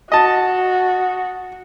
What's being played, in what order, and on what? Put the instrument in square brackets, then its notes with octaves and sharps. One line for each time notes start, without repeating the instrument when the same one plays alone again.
[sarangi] F#4 [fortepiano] D#5 A5